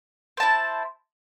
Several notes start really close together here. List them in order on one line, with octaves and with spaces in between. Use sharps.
C5 A5 E4